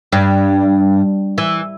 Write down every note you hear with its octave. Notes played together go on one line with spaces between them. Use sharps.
G2
E3